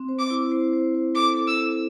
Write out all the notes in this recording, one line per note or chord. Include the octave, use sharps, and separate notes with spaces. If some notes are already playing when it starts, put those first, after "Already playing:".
Already playing: C4
C5
D6
E4
C5
C5
C5
A4 D6
A4
E6
E4